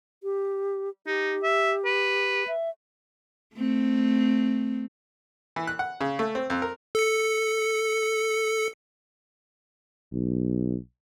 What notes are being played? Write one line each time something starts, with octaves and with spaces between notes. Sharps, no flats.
G4
D#4 G4
E5
B4
E5
A3 C4
E3
F#6
F#5
C#3
A3
C4
F2
A#4
A4 C#7
B1